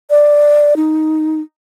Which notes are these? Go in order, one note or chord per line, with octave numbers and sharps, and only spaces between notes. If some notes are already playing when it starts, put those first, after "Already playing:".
D5
D#4